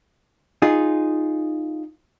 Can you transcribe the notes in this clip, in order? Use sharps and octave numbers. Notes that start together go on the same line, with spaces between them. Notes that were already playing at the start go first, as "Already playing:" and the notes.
D#4 F4 G#4